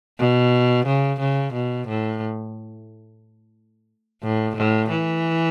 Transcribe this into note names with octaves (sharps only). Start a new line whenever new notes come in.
B2
C#3
C#3
B2
A2
A2
A2
E3